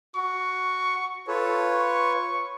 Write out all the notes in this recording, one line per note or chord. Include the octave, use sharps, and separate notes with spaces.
F#4 C#6
F4 A4 B4 C#5
C#6